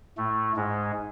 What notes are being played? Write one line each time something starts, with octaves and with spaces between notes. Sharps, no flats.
A2 A3
G#2 G#3